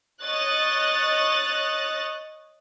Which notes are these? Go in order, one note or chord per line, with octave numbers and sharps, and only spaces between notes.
C#5 D#5 F#6 A6